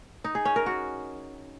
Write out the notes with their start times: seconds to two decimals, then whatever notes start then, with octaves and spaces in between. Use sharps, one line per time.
0.24 D#4
0.35 G#4
0.45 C#4
0.56 A#4
0.66 F#4